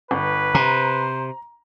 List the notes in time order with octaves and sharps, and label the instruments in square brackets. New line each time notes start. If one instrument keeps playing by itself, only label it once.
[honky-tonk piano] G1 [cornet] B4
[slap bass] C3 [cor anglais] C5 [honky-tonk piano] A#5